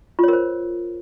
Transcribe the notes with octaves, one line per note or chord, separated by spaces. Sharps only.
F4 A#4 C5 C#5